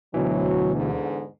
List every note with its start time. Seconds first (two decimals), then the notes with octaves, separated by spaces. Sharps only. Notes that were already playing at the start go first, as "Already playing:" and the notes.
0.14 D2 B2 E3 F#3
0.74 E2 G#2 D3